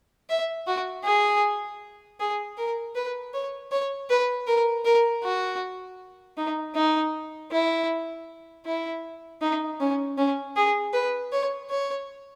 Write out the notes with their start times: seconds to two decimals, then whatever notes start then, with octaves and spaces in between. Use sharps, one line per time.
0.29 E5
0.67 F#4
1.04 G#4
2.20 G#4
2.57 A#4
2.95 B4
3.34 C#5
3.72 C#5
4.10 B4
4.47 A#4
4.85 A#4
5.23 F#4
6.37 D#4
6.75 D#4
7.51 E4
8.65 E4
9.41 D#4
9.80 C#4
10.18 C#4
10.56 G#4
10.93 B4
11.32 C#5
11.70 C#5